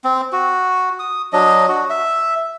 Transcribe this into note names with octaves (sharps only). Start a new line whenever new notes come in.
C4
F#4
D#6
F#3 D4 D#5
F#4
E5